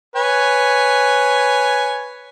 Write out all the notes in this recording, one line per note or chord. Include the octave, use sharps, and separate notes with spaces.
B4 C#5 G#5